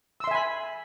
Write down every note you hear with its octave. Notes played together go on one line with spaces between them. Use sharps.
E5 G#5 B5 C6 E6